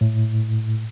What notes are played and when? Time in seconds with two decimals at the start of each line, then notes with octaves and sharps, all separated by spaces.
0.01 A2